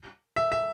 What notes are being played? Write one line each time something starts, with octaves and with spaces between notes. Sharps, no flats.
E5
E5